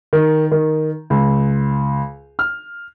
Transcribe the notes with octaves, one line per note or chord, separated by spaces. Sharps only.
D#3
D#3
C#2
F6